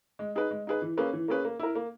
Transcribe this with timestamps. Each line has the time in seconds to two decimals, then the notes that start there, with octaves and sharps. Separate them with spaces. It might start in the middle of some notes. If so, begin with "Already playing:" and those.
0.19 G#3
0.35 D#4 G#4 B4
0.51 G#3
0.67 D#4 G#4 B4
0.82 E3
0.97 A#3 C#4 G#4 B4
1.13 E3
1.28 A#3 C#4 G#4 B4
1.45 A#3
1.59 E4 A#4
1.75 A#3